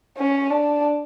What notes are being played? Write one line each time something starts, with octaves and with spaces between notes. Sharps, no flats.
C#4
D4